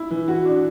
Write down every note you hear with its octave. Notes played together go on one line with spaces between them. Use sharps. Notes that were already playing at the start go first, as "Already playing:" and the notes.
Already playing: E4
E3
F#4
D4